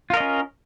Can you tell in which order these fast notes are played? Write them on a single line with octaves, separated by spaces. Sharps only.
F4 A#4 D#5 C#4